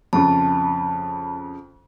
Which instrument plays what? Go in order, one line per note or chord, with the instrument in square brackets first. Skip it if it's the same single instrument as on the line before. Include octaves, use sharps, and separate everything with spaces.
[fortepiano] F2 C#3 [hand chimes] A5